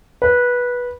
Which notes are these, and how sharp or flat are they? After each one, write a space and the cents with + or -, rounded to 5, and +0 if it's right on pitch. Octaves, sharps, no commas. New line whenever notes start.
B4 -15